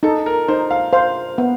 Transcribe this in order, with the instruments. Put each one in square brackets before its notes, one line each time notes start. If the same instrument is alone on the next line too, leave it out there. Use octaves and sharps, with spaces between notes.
[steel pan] D#4 [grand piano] A4
[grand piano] A#4
[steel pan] D#4 [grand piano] C5
[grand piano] F5
[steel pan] C5 [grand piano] F5
[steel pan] B3